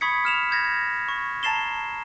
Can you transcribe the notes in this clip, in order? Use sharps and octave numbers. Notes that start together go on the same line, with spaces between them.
B5 C#6 D#6 G#6 B6 C#7
F6 E7 F7
G6 G#6 A#6
C#6
A5 A#5 A6 C7 E7 G7